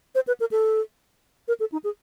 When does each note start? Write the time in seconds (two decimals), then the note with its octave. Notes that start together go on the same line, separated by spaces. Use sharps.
0.15 C5
0.27 B4
0.40 A#4
0.51 A4
1.48 A#4
1.60 A4
1.72 D#4
1.84 G#4